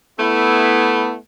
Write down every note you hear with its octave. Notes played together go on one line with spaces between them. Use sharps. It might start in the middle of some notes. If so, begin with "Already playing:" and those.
A3 B3 E4